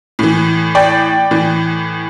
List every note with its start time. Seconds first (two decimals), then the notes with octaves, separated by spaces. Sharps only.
0.19 A2 E3
0.75 D5 G5
1.31 A2 E3